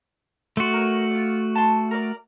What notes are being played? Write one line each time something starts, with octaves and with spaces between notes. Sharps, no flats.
A3 F#4 D5 C6
A#4 C#5
F4 D5
A5 C6
A#4 D5